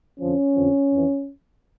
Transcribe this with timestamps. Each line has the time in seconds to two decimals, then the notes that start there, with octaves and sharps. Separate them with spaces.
0.20 F2 D3 F3 C#4
0.55 F2 D3 F3
0.90 F2 E3